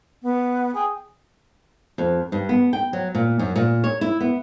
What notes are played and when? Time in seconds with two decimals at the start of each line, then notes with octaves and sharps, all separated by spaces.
0.23 B3
0.75 G#4 G5
1.98 F2
2.32 G2
2.49 B3
2.73 G5
2.93 F#3
3.15 A#2
3.39 F#2
3.56 A#2
3.84 C#5
4.01 E4
4.21 B3